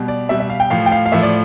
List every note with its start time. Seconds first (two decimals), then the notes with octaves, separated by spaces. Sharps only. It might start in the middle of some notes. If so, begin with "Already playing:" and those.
Already playing: B2 G3
0.08 D5
0.29 B2 G3 E5
0.40 E5
0.50 F5
0.60 G5
0.70 A2 F3 F5
0.86 G5
0.92 F5
1.06 F5
1.12 A2 F3 E5
1.23 D5